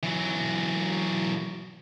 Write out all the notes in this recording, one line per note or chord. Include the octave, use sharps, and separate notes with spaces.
E3 F#3